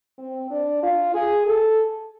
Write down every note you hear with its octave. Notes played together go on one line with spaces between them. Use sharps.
C4
D4
F4
G#4
A4